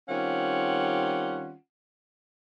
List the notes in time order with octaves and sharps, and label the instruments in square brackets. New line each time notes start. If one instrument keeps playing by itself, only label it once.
[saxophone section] D#3 G3 C4 C#4 F4 F#5